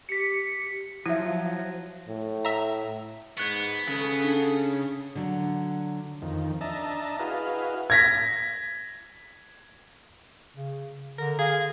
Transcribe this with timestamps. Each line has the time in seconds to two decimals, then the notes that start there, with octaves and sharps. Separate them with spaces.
0.09 G4 B6 C#7
1.06 F3 F#3 E4 E5
2.08 A2
2.45 E5 A#5
3.37 G#2 B3 C#6 F#6 G#6
3.89 C#3 A4
4.24 D4
5.15 D3 F#3
6.22 F2 D#3
6.61 D4 D#5 E5 A5 A#5
7.19 E4 F#4 G#4 B4 D#5 F5
7.90 G#6 A#6 B6
10.55 C#3
11.18 D3 A#4
11.39 G#4 F5